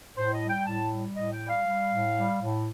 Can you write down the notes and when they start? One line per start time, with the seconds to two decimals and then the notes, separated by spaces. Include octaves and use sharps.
0.17 A2 C5
0.33 D#5
0.42 G3
0.50 G5
0.66 A2 A5
0.91 G3
1.16 A2 D#5
1.33 G5
1.42 G3
1.49 F5
1.67 G3
1.90 A2
2.16 G3
2.41 A2